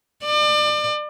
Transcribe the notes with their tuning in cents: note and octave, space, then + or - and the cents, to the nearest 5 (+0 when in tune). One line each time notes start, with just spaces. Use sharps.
D5 +35